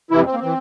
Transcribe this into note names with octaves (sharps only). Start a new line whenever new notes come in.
F2 C3 E3 E4
C4
A#3
E3 C4